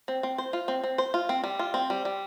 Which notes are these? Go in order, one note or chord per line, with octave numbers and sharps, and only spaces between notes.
C4
C4
C5
F4
C4
C4
C5
F4
C4
G3
F4
C4
G3
G3